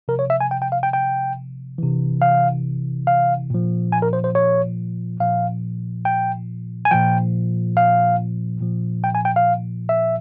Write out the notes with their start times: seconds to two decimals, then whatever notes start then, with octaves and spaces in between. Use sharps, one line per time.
0.08 C3 F3 A#4
0.19 C#5
0.30 E5
0.41 G#5
0.51 G5
0.62 G5
0.72 F5
0.83 G5
0.93 G5
1.78 C3 E3
2.22 F5
3.07 F5
3.50 A#2 F3
3.92 G#5
4.02 A#4
4.13 C5
4.24 C5
4.35 C#5
5.20 A#2 F3 F5
6.05 G5
6.85 G#5
6.91 A#2 F3 G5
7.77 F5
8.61 A#2 F3
9.04 G5
9.15 G#5
9.25 G5
9.36 F5
9.89 E5